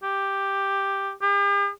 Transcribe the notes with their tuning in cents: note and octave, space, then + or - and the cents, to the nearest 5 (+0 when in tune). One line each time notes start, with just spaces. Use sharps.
G4 +5
G4 +45